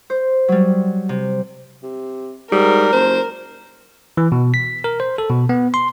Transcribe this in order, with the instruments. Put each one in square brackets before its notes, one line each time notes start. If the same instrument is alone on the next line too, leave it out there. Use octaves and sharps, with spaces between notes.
[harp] C5
F#3 G3
C3
[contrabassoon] C3
[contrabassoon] G#2 [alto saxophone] G3 [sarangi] A#4
[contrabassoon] F#1 [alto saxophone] C5
[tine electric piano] E3
B2
B6
A#4
C5
A4
B2
B3
C6